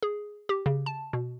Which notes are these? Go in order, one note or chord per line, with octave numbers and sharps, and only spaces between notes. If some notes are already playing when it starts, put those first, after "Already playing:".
G#4
G4
C#3
A5
B2